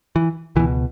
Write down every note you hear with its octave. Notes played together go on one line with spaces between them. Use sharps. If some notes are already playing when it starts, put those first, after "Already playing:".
E3
C#2 B2 E3